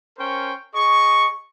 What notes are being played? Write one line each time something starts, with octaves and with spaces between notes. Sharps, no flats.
C#4 A#4 C5 G5 C#6
G#4 D#5 C#6